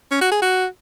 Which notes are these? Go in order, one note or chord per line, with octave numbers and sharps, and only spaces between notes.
C#4
F#4
G#4
F#4